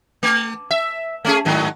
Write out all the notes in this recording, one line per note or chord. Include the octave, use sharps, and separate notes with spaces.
A3
E5
A3 C#4 G#4
G#2 D#3 F#3